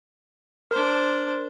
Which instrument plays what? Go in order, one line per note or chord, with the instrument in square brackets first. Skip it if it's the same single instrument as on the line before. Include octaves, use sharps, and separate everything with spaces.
[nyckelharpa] D4 C5 [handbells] A#4